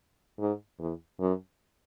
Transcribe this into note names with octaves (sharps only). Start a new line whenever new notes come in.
G#2
E2
F#2